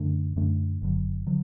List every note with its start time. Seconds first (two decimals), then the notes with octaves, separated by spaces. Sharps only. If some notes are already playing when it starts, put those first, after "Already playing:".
Already playing: F#2 D3 A3 D4
0.36 F#2 D3 A3 D4
0.82 F#1 F#2 D3 F#3
1.27 D3 F#3